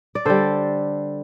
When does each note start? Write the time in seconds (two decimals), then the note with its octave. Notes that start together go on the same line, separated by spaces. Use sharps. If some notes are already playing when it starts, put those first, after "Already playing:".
0.15 D5
0.25 D3 G3 A4 C5